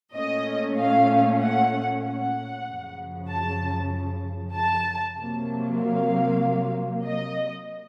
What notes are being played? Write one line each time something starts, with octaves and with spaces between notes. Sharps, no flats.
A#2 A3 C#4 D#5
F5
F#5
F#5
F#2 C#3 F3
A5
A5
C3 F#3 A#3
F5
D#5